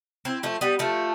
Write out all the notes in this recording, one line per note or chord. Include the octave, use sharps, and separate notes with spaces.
C4 E4
F3 A3
G3 B3
F3 A3